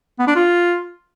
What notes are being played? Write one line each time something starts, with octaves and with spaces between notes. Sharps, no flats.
B3
D4
F4